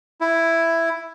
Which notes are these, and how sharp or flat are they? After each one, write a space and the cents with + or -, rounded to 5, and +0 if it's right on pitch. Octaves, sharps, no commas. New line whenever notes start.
E4 +5